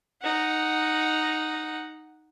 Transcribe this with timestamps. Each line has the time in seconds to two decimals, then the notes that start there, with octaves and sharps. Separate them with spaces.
0.22 D#4 F#5